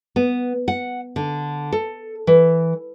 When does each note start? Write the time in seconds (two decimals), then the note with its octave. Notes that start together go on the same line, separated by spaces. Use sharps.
0.16 B3
0.68 F#5
1.16 D3
1.72 A4
2.27 E3